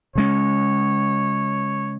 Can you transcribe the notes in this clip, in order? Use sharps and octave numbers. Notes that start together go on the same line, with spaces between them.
C#3 G#3 C#4 C#5